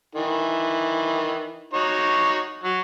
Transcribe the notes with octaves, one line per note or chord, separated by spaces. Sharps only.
D#3 E3
D#4 F#4 C#5
F#3